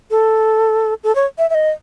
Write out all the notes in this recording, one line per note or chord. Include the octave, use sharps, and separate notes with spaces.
A4
A4
C#5
E5
E5
D#5